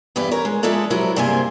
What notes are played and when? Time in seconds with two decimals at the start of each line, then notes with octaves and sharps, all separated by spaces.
0.16 E2 G2 G4 B4
0.31 A#4 C#5
0.45 G#3
0.63 F3 G#3 D#4 E4 A4 D5
0.90 F#3 G3 C4 E4 A#4
1.16 G2 C3 A#3 G#4 C5 G#5